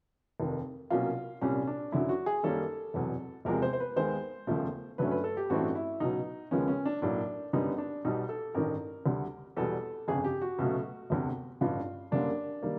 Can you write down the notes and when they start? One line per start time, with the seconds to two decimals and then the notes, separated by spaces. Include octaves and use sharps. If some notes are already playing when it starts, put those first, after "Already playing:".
0.40 F1 D#2 D#3
0.90 C2 B2 F#3 A#3 C#4 F4
1.41 C2 A#2 G3 C#4
1.67 D4
1.92 F#2 D3 F#3 E4
2.09 F#4
2.26 G#4
2.43 F#2 D#3 G3 A#3 C#4 A4
2.94 F1 E2 B2 F#3
3.45 E1 E2 C3 F3 G#3 A#4
3.62 C5
3.73 C5
3.80 B4
3.96 D#2 D#3 G#3 B3 C5
4.47 E1 D#2 C#3 F3 A3
4.98 G2 D3 F#3 A3 C#4 B4
5.11 B4
5.24 A4
5.37 G4
5.50 A1 G2 E3 A3 C4 F#4
5.75 E4
6.00 C#2 B2 F#3 D#4
6.51 D#2 C#3 F3 G#3 B3 C#4
6.68 C#4
6.86 D4
7.02 B1 A2 F#3 A#3 D4
7.53 F#2 D3 G3 B3 D#4
7.78 D4
8.05 B1 B2 G3 D#4
8.29 A4
8.54 A1 G2 D#3 A#4
9.06 D2 D3 G3
9.57 E2 B2 G3 B3 A4
10.08 G1 F2 C#3 G#4
10.24 G4
10.42 F#4
10.59 C#2 B2 F#3 A3
11.10 E1 D2 C3
11.61 A1 G2 D3 F4
12.11 F#2 D3 G3 A#3 D4
12.63 D#3 G3 A#3